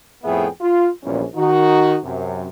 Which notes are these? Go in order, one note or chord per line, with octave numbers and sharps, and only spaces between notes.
F2 A2 B3 G#4 E5 G5
F4
A#1 E2 A#2 G3 C#4
D#3 D#4 F#4
F#2 C3